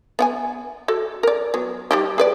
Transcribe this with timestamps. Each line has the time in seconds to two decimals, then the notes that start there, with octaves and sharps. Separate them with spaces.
0.19 B3 F#5 G#5
0.88 F#4 A4
1.23 A#4 D5
1.54 F#3 B3
1.91 G3 D#4 G4
2.18 G#4 B4 D5